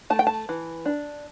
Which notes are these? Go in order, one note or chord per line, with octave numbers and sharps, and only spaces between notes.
A3 A5
G5
A5
E3
D4